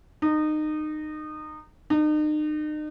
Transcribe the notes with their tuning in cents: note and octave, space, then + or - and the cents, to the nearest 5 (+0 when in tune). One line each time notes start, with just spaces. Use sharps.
D#4 -25
D#4 -40